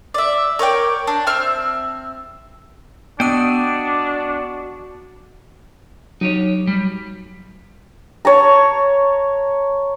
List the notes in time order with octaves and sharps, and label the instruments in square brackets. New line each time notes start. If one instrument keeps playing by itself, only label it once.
[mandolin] D5 E5
A#4 C#5 D5 G5
D4
C4 E5 F6
[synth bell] B3 E6 [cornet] D4 [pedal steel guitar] F#4 D#5 G5
[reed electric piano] F#3 [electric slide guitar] D#4 G4 C#5
[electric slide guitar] G3
[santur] C#5 A5 A#5